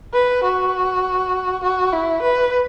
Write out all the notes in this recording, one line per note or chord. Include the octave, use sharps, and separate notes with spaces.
B4
F#4
F#4
E4
B4